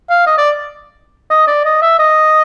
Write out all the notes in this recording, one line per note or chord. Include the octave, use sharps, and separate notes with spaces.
F5
D#5
D5
D#5
D5
D#5
E5
D#5